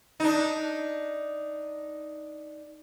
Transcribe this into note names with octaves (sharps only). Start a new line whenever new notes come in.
D4 D#4